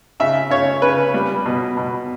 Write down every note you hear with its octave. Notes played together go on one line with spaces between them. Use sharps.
C#3 E5
C#3 C#5
C#3 B4
G3
B2
B2